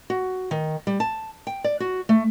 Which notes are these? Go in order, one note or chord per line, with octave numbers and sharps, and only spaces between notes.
F#4
D#3
G3
A5
G5
D5
F#4
A3